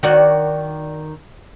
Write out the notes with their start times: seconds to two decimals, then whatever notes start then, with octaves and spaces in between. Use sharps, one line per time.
0.03 D#3 F#4 D5